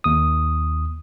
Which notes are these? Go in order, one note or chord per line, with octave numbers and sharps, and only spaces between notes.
D#2 D#6